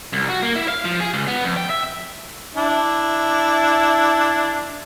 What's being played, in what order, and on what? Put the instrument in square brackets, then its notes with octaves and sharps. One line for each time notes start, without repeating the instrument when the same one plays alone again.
[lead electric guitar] C2
F#4
A#3
E4
F5
F3
G#4
C#2
B3
F2
G5
E5
[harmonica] D4 E4